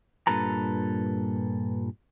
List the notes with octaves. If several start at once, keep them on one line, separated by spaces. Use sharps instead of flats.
G2 A#2 A4 B4 A#5